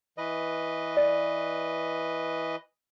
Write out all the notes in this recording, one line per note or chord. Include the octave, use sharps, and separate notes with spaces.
E3 B4 D#5
D5